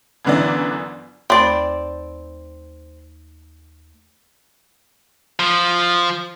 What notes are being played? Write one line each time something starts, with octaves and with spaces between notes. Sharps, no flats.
G1 F#2 D3 E3 B3 D5
D#2 A3 C4 D5 B5
F3